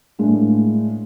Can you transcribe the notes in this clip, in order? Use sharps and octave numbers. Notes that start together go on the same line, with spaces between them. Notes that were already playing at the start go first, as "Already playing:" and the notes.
A2 G#3 A#3 D4